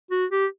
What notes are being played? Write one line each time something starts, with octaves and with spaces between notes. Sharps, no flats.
F#4
G4